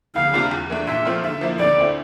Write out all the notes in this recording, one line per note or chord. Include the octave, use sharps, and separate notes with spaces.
D2 F5
C3 G3 D4 F4
E2
E3 A3 D4
A#2 E5
F3 A3 C4 F4
D3 E5
F3 A#3 E4
D2 D5
D3 A3 C4 E4